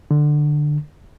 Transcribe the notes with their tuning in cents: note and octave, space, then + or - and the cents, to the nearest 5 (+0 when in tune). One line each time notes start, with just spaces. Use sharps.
D3 +15